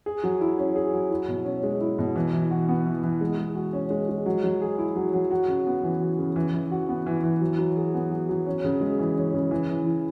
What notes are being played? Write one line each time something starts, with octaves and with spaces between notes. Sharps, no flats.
G#4
F#3
E4
C#4
G#4
F#3
E4
B2
C#4
G#3
E4
B2
E3
E3
F#4
B3
E3
E3
G#3
G#3
F#4
C#4
G#3
G#3
F#3
F#3
G#4
E4
F#3
F#3
F#4
C#3
B3
E3
F#4
C#3
E3
E3
F#4
B3
E3
E3
F#3
F#3
G#4
B3
F#3
F#3
C#4
C#3
G#3
E3
C#4
C#3
E3
E3
E4